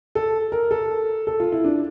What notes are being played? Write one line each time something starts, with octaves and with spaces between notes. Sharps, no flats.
A4
A#4
A4
A4
F4
E4
D4